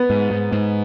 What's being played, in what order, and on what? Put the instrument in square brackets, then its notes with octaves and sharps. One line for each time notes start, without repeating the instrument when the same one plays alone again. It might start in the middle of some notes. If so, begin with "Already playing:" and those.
Already playing: [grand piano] B3
[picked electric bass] G#2
G#2
G#2